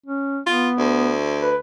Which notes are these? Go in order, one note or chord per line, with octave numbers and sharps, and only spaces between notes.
C#4
B3 F4
D2
B4